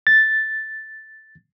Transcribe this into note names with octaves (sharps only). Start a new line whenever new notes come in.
A6